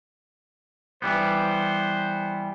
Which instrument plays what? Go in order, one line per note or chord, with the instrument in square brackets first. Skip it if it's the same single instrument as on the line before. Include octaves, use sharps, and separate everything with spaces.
[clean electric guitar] E3 G3 B3 [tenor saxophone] C5